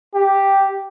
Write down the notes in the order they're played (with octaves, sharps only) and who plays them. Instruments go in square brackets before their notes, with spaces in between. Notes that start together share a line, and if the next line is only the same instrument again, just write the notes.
[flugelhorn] G4